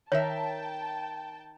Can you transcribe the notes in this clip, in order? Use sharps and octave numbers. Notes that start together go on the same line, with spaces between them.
D#3 A#4 C#5 E5 G5 A5